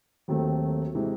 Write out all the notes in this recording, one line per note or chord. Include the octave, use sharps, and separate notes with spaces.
D#2 D#3 F#3 A3 C4
C3 E3 G#3 C4